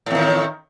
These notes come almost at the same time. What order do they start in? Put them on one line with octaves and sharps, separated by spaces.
A2 E2 D#3